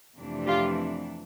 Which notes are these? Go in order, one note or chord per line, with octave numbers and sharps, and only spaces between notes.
F2 C3 E3 A3 D4
F4 G4